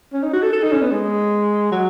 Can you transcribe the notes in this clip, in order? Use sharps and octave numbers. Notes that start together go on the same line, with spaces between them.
C#4
D#4
F#4
A4
A4
D#4
C#4
B3
G#3
F#3